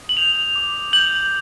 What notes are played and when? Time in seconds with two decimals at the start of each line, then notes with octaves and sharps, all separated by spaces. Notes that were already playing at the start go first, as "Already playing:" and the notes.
Already playing: D#6
0.09 F#7
0.17 G6 F7
0.55 D6
0.93 G6 F#7